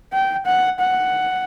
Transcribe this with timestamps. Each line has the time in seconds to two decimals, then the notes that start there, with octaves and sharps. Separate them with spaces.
0.13 G5
0.46 F#5
0.80 F#5